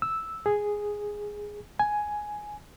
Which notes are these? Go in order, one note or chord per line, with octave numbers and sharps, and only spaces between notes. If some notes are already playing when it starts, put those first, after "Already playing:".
E6
G#4
G#5